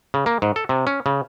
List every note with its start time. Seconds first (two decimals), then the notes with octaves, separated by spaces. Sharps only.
0.14 C#3
0.26 A#3
0.42 G#2
0.56 A4
0.69 C3
0.87 C#4
1.06 C#3